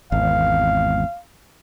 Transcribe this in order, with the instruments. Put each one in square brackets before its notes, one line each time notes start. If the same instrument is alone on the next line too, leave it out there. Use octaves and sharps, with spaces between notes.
[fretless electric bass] G#1 E2 [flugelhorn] F5